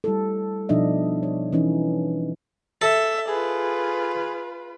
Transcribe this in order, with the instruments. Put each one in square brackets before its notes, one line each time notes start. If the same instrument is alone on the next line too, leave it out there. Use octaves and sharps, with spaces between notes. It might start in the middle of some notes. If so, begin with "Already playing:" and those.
[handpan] G3 E4 A4
B2 F3 D4 D#4 D#5 E5
C#5
E3 C#4 D#4
[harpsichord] A4 [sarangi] E5
[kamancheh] F4 B4 [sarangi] G#4